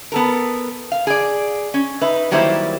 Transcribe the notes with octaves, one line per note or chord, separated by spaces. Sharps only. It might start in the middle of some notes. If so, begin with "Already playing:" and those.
B3 A4 A#4
F5
G#4 D5
C#4
D#4 B4 E5
D#3 F#3 G3 A#3 E4 C5